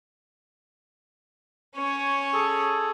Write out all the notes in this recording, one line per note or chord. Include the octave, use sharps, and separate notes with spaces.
C#4 C#5
G#4 A4